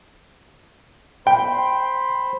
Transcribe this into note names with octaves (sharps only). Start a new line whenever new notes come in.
C5 G5 B5 C6